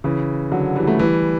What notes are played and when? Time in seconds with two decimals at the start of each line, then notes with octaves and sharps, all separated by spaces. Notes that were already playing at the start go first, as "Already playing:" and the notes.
0.04 C#3 E3
0.52 D3 F#3
0.76 E3 G3
0.87 A3
0.99 E3 G3